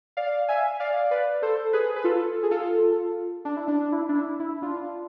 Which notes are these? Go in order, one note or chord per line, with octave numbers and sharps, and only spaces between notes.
D5 F5
E5 G#5
D5 F5
B4 D5
A4 C5
G#4 B4
B4
F4 A4
G#4
F4 A4
D4
E4
D4
E4
D4
E4
E4
D4 F4